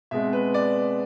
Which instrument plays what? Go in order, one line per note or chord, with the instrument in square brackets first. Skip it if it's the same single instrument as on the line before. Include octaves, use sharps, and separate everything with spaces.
[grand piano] B2 G#3 C4 E5
B4
D5